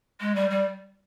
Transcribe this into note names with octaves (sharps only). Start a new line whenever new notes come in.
G#3
G3
G3